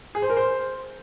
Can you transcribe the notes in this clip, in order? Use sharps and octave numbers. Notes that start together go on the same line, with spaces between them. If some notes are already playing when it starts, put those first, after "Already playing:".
G#4
C5
A#4
C5